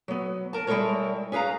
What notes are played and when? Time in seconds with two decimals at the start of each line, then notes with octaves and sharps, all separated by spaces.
0.08 F#3 B3
0.53 A#4 A5
0.67 G3 G#3 E4 A4 A#4 C#5
1.32 C#4 G#4 B4 F5 A#5